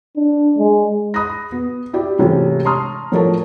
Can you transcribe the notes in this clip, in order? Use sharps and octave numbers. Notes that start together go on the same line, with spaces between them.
D4
G#3
B5 D#6 F#6 A#6
B3
E4 G4 D5
G#2 C3 E3 A3 C#4
A5 A#5 C6 C#6 D#6 F6
A2 F3 A4 A#4 C#5 A5